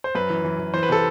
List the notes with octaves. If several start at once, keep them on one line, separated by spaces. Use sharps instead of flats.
C5
F#2 B4
E3
E3
E3
E3 C5
B4
C3 A4